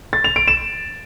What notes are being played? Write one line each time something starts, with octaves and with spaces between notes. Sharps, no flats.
A6
F7
D7
E7